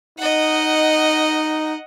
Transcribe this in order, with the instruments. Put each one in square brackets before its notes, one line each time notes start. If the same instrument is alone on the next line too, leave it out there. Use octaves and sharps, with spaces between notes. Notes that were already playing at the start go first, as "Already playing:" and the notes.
[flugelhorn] D#4 [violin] D#5 F#5